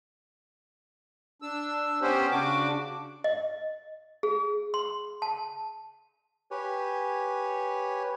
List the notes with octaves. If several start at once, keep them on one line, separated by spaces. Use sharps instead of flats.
D4 E6
B3 C#4 G4 C5
C#3 D4 F#4 D6
D#5
G#4
C6
A5
G4 B4 C#5 G#5